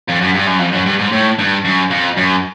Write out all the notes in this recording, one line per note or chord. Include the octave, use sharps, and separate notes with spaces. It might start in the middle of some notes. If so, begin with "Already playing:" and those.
F2
F#2
G2
F#2
F2
F#2
G2
G#2
A2
G2
F#2
F2
F#2